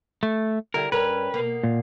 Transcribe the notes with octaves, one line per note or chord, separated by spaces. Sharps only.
A3
D3 G3 E4 A#4
G2 C#4 A#4 B4
B2 A#3
A#2